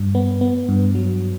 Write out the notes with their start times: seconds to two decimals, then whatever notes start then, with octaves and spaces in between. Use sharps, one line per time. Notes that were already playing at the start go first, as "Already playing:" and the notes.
Already playing: G2
0.15 B3
0.41 B3
0.69 G2
0.95 F#3